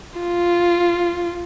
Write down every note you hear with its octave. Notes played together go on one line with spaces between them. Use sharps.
F4